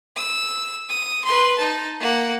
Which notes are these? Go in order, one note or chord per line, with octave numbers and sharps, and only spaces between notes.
E6
D#6
B4 C6
D#4 A5
A#3 F#5